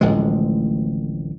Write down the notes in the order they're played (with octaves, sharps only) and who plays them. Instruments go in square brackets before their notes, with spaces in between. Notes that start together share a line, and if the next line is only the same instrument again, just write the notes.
[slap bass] D1 A1 F3 G#3